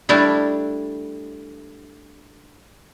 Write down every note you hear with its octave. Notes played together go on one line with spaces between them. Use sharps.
G3 A3 D4 E4